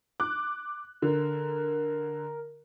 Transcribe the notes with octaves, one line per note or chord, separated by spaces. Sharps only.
D6 F#6
D3 A#4